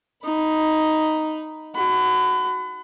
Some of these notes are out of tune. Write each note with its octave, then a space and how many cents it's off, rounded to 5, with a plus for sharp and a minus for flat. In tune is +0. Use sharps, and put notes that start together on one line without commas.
D#4 +0 B5 +0
F#4 +0 B5 +35